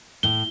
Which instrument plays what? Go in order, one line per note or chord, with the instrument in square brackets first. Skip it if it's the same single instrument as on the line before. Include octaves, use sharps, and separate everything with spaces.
[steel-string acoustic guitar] A2 [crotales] G7